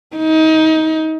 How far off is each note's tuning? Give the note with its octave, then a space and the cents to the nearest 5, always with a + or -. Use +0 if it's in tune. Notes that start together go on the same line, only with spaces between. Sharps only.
D#4 +25